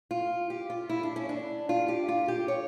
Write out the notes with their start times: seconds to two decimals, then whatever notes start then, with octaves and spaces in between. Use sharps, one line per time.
0.11 F4
0.50 G4
0.70 F4
0.89 E4
1.03 D4
1.16 C#4
1.29 D4
1.69 F4
1.88 G4
2.08 F4
2.28 G4
2.48 C#5